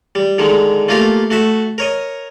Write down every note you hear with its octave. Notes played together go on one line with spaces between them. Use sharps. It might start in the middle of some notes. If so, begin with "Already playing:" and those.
G3
D3 D#3 G#3
A3 A#3 F4 G4 A#4
A3 F#4 E5
A#4 C#5 D#5